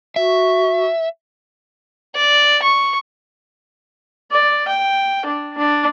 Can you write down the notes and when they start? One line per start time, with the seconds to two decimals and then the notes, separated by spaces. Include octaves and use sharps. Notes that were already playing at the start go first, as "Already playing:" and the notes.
0.16 F#4 E5
2.15 D5
2.62 C#6
4.32 D5
4.68 G5
5.26 D4
5.58 D4